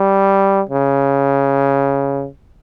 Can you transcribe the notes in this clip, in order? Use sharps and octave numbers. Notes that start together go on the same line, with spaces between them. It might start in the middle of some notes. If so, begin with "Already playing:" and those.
Already playing: G3
C#3